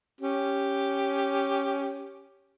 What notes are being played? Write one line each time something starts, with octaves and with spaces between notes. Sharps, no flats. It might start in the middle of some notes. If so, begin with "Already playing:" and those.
C#4 G4